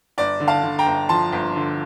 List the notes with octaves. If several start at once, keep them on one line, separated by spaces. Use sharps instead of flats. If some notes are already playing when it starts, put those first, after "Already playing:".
G1 D5
D3
F5 A5
D3
G5 A#5
G1
F3 A5 C6
G1
D3